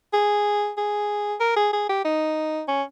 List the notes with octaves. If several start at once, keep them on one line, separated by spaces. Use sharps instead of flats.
G#4
G#4
A#4
G#4
G#4
G4
D#4
C#4